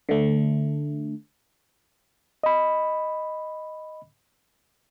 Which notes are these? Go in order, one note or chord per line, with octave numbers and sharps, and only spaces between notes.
D3 A3
D#5 B5